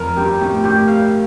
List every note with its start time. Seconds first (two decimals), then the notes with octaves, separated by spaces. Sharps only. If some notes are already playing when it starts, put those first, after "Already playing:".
Already playing: F2 A#4
0.17 G2 G4
0.41 A2 G4
0.64 A2 G4
0.88 F5